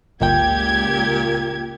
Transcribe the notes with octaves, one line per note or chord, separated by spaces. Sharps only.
G1 C#2 A#2 G4 G5 G#6